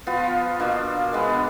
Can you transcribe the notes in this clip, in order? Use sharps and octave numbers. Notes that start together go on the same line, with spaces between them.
F3 B3 F4
B2 A#3 D4
G#3 B3 D4